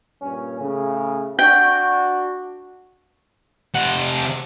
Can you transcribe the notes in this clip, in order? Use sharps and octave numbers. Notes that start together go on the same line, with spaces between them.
G2 A#2 C#4
A2 C#3
D4 F#4 G5
C3 F#5